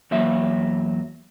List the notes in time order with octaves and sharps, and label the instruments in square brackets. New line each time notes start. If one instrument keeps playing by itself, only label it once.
[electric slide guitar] E2 F#3 A#3 E5